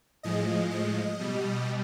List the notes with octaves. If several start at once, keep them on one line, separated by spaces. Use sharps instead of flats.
A2 F3 G#3 D#5
D#5
B2 G3